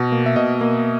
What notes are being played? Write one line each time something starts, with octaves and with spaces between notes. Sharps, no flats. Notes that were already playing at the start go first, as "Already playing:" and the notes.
Already playing: B2
A#3
E5
B2 D#5
A#3